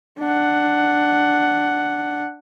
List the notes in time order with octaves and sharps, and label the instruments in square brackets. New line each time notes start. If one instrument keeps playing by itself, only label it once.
[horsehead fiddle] D4 F#5